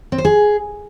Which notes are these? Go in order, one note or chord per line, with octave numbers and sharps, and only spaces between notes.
C4
C5
G#4